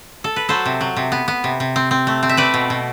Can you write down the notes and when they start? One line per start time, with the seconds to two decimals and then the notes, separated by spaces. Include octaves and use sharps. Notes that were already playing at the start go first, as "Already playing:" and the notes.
0.24 A4
0.36 B4
0.49 F#3 A4 C5
0.66 C3
0.81 F#3
0.96 C3
1.12 B3
1.28 B3
1.44 C3
1.60 C3
1.76 C4
1.91 C4
2.07 A3
2.23 C4
2.29 E5
2.37 A3 B4 D5
2.54 B2
2.70 B2